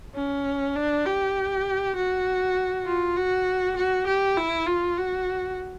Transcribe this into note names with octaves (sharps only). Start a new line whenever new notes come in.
C#4
D4
G4
F#4
F4
F#4
F#4
G4
E4
F4
F#4